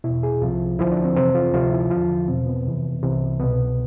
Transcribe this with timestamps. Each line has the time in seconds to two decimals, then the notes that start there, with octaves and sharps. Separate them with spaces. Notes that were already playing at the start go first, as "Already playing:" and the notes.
0.04 E2 B2 E4
0.23 G#4
0.42 C2 C3 F3 F4
0.78 D2 D3 F3 E4
0.92 D4
1.04 C4
1.16 F2 C3 E3 C4
1.35 F4
1.54 D2 C3 F3 F4
1.72 E4
1.90 E2 D3 F3 F4
2.28 E2 B2 C4
2.47 B3
2.65 F2 C3 E3
3.03 C2 C3 E3
3.39 C2 B2 B3